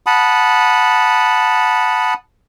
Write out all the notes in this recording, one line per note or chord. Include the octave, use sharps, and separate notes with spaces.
F#5 A5 B5 D#6